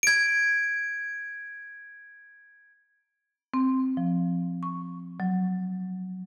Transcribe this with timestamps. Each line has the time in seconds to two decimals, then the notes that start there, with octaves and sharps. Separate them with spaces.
0.03 G#6 D7
3.54 C4
3.97 F3
4.63 C#6
5.20 F#3